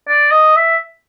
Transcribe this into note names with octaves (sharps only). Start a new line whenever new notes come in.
D5
D#5
E5